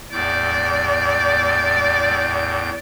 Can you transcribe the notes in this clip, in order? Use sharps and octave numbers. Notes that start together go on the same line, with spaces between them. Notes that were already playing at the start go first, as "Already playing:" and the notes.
E2 A2 D5 G6